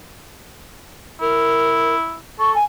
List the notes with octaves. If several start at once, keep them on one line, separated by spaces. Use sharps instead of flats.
E4 A#4
A4 C#6
G#5